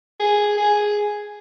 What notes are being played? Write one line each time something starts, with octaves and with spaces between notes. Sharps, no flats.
G#4
G#4